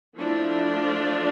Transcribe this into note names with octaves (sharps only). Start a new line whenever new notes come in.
F3 A3 D4 E4
F4